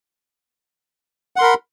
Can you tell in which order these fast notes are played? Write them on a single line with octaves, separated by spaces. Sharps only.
F#5 C6 A#4 B5